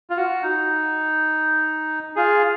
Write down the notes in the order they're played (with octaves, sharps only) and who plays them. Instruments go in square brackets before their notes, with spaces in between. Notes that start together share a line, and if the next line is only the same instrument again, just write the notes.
[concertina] F4
F#4
D#4
F4 G#4